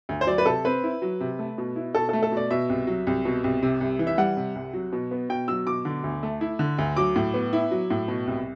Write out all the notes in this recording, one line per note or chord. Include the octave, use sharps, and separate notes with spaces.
D2
C5
F#3 D5
B4
C3 A4
C4 B4
E4
F#3
C3
A3
B2
E4
B2 A4
A3 A4
A4
B2 D5
B2 E5
C2
F#3
C2
B2
C2
C3
C2
E3
E5
G3 F#5
C3
C2
F#3
B2
B3
B2 G5
F#3 E6
B2 D6
D3
D2
A3
E4
D3
D2
F#3 D6
A2
B3
E4
F#3
A2
B2
C2